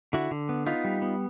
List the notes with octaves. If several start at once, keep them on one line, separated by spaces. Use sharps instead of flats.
D3 E4 F#4
D3
B3
B3 D#4 F4
G3
B3